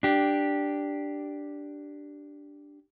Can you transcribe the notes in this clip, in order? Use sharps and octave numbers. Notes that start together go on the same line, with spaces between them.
D4 G4